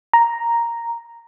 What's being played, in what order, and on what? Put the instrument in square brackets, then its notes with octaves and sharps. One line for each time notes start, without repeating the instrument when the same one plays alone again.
[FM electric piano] A#5